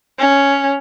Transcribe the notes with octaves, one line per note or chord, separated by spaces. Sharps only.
C#4